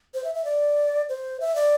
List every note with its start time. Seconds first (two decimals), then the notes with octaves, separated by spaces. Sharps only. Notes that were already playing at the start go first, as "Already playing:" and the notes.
0.14 C5
0.24 E5
0.35 E5
0.45 D5
1.09 C5
1.40 E5
1.56 D5